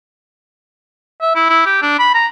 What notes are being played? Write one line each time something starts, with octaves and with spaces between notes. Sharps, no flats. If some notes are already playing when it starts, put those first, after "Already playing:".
E5
E4
E4
G4
D4
B5
A#5